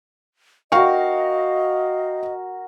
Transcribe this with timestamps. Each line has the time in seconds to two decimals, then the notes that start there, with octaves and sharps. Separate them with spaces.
0.72 F#4 A#4 D#5 F5 G5 C#6